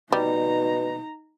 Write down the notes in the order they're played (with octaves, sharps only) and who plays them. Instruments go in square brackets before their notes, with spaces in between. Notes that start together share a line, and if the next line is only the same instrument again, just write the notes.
[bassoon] B2 [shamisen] G3 [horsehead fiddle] D#4 A#5